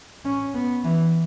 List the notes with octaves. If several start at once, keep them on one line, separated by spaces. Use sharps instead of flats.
C#4
B3
E3